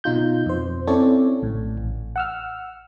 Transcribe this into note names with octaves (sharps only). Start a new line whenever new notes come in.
B2 D#4 F4 G6
F2 C5
C4 C#4 E4 A4 C#5 D5
A#1 A2
A1
F#5 E6 F6